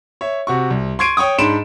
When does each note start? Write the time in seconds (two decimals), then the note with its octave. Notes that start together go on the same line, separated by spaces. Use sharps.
0.21 C#5 E5
0.47 C3 F#4 C#6
0.70 C2
0.99 C6 C#6 G#6 C7 D7 D#7
1.17 C#5 G5 C#6 D#6
1.38 G#2 D4 B5 C6 D7 E7